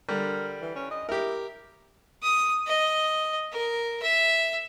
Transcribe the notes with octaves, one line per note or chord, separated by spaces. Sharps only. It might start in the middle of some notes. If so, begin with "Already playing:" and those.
D3 G3 A#4
E3
C#4
D#5
E4 G4 A#4
D#6
D#5
A#4
E5